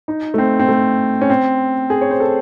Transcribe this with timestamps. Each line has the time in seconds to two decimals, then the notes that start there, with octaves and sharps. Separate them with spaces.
0.08 D#4
0.34 A3
0.38 C4
0.60 C4
0.68 A3
1.21 C#4
1.30 C4
1.90 G#4
2.01 C#5
2.11 C5
2.20 A4